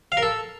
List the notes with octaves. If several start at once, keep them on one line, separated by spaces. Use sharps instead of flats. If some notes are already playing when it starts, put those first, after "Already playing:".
F5
A#4
A4